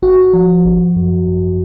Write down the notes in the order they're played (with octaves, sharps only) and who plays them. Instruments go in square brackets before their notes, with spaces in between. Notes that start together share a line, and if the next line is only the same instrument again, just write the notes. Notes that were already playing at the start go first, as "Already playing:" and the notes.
[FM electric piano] G#1 F#4
F3
G#1
F#2
G#1